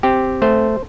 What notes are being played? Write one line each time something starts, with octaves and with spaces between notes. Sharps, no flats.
C4 G4
A3 C5